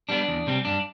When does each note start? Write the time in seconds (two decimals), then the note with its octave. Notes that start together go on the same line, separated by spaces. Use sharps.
0.09 G3 B3 D4
0.28 E2
0.47 C3 G3 C4
0.65 G2 D4